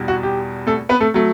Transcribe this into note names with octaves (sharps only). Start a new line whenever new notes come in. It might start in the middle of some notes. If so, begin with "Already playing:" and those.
Already playing: E2 B2 G3
F#4
G4
A3 A4
B3 B4
A3 A4
F#3 A3